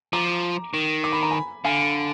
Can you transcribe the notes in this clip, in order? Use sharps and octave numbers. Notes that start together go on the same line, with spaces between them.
F3 A#5 D6
D#3
D6
B5
A#5
G#5 B5
D3 F5 G#5